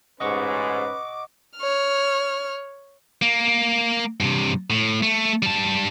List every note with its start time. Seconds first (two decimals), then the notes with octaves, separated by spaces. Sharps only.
0.20 A1 G#2 C#4 B4 D#5 F#5 C#6 D6
1.58 C#5 F6
3.22 A#3
4.20 G2 C3
4.70 A2
5.03 A3
5.43 G3 A5